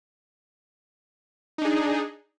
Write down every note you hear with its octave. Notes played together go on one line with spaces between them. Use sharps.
D4 D#4 G#4